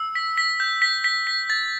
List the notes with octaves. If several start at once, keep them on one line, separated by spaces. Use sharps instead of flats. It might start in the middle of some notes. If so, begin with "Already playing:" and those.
Already playing: E6
B6
B6
G6
B6
B6
B6
A6